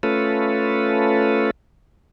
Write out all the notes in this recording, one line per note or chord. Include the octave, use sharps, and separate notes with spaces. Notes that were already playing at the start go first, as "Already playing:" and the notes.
A3 C#4 F4 A4 B4